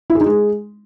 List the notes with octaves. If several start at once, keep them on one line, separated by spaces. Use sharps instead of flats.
E4
G#4
D#4
G#3